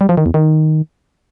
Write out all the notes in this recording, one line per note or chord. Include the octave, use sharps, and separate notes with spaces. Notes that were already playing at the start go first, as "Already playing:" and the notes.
G3
F3
D#3
E2
D#3